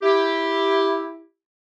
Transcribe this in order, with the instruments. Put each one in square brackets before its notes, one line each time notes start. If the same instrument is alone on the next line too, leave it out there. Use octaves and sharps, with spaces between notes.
[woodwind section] E4 G4